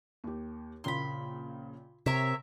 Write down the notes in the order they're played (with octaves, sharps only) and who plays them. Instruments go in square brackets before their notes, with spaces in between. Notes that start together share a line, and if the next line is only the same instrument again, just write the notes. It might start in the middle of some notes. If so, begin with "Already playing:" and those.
[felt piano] D#2 G4
[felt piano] A#1 C#3 A#3 [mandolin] B5 C6
[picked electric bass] C3 [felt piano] C4 [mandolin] A#4 C#5 E5